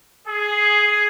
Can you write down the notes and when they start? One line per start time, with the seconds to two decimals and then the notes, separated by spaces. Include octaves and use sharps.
0.28 G#4